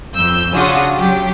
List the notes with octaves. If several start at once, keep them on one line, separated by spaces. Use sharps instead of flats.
F2 E6 G6
C#3 C#4 D4 F4 F#4 D#6
F#3 G4